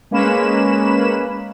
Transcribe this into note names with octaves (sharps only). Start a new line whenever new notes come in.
G#3 A#3 C#4 B4 B5 E7